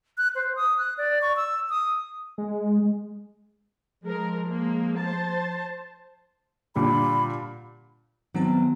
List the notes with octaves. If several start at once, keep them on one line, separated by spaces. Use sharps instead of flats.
F#6
C5
D#6
F#6
D5
C#6
E6
D#6
G#3
F3 G#3 A#4
G#3 A#3
C5 A5
A#2 D3 G3 B5
D#3 F#3 B3 C4 A5